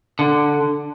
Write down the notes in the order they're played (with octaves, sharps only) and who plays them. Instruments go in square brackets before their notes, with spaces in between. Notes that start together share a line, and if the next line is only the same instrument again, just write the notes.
[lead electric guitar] D3